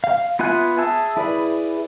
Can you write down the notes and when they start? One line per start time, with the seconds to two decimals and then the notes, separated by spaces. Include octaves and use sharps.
0.04 F5
0.39 B3 F4 E5 G#5 F#6
0.78 G#4 E5 A5 E6
1.17 E4 G#4 B4 D5